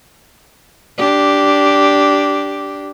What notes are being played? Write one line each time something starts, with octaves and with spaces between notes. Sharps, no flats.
D4 G4